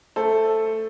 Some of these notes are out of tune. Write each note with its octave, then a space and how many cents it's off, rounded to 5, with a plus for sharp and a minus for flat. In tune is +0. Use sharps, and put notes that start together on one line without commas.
A3 +5 A4 +0 C5 +10